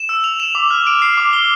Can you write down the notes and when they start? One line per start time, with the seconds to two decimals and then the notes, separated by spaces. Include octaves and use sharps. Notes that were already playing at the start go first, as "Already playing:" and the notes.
Already playing: E7
0.09 E6
0.24 F7
0.40 E7
0.55 D6
0.70 F6
0.87 D7
1.02 C7
1.17 D6
1.33 G7